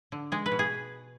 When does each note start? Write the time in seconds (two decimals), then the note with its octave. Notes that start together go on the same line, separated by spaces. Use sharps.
0.12 D3
0.32 G#3 G#4
0.46 B4
0.52 B2
0.59 G#4